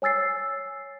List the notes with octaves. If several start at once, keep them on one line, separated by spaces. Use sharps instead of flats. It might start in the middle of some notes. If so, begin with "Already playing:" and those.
C#5 G#5 E6 A6 C7